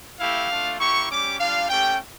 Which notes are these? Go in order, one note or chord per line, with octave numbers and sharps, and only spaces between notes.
A3 E4 G4 F5
A3 D4 F4
A#3 E4 G4 C#6
G3 C#4 G4 D6
G3 D4 F4 F5
A3 C#4 G4 G5